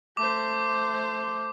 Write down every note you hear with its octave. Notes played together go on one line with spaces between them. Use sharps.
A3 C5 D6